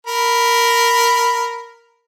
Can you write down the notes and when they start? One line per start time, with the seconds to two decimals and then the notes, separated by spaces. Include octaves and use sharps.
0.07 A#4 B5